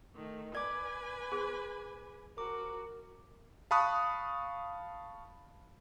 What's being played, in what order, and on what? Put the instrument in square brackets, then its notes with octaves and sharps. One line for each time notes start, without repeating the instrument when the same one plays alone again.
[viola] D#3 A3
[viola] B4 G#5 [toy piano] D5 [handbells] D6 G#6
[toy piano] G#4 C5 C6
[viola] F#4 [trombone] A#4 [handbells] D6
[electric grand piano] F5 A5 B5 C#6 D#6 F#6